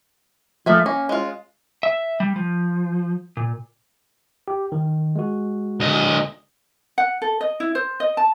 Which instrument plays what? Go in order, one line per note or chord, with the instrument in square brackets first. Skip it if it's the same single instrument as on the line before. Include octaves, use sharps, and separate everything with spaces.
[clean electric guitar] F3 A3 [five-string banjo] A#3 E5 G#5
[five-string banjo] A#3 [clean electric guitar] C#4
[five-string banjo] G#3 F4
[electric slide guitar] E5
G3
F3
A#2
[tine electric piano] G4
D#3
G#3 F#4
[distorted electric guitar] D2 D#5
[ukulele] F#5
A4
D#5
E4
C5
D#5
A5